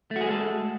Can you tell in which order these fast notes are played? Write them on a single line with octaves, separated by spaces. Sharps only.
A3 F#4 G#4 G#3 A4